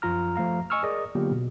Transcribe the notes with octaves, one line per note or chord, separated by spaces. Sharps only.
F#2 F3 F4 A#5 F6
F3 A3 F5 A#5
D#5 G#5 C#6 E6 F6
G#4 A#4 D5 D#5
D3 F#3 A#3 B3 F4 G4
B2